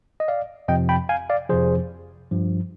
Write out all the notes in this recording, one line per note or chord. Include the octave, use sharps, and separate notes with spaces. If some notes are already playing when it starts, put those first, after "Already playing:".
D#5
D5 F5
F2 C3 F3 D#5 G5
G5 B5
F5 G#5
D5 F5
F2 C3 F3 G#4 C5
G2 F3